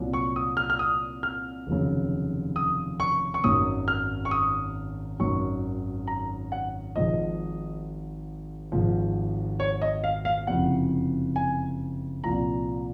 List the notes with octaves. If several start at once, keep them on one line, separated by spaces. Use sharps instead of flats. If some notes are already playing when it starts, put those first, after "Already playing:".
Already playing: C2 A#2 F#3
C#6
D#6
F6
F6
D#6
F6
F1 D#2 C#3 F#3
D#6
C#6
C#6
G#1 F#2 D#3 F#3 D#6
F6
C#6
D#6
G#1 F#2 D#3 F#3 C#6
A#5
F#5
G#1 G#2 F3 D#5
G#1 G#2 F3
C#5
D#5
F5
F5
F#1 F2 C3 F#5
G#5
C2 A#2 F3 A#5